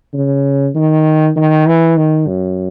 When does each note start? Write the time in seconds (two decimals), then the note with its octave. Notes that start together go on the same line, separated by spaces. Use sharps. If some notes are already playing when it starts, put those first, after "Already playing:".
0.14 C#3
0.75 D#3
1.36 D#3
1.66 E3
1.97 D#3
2.28 F#2